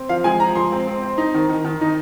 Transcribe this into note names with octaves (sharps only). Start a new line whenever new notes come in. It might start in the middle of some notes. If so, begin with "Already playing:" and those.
Already playing: C4
F3 F5
G#3 G#5
F3 A#5
G#3 C6
C4
C4
C4
D#4
D#3
D#3
D#3
D#4